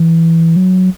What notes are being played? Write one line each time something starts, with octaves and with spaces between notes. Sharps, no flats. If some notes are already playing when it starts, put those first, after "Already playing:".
Already playing: E3
F#3